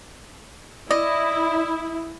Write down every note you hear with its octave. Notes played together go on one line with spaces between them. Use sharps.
E4 D5 D#5